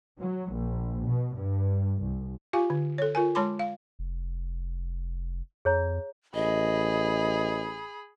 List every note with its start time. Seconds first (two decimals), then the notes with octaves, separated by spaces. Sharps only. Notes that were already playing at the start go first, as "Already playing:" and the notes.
0.20 F#3
0.52 A#1
1.06 B2
1.36 G2
2.02 C2
2.53 F4 G4 F5 G#5
2.70 D3
2.98 A4 C#5
3.15 F4 A#4 G#5
3.35 G#3 C#5 A5 B5 C6 D6
3.59 F5
3.99 F1
5.65 F2 G#4 C#5 A#5
6.34 A1 G#4 D#5 B5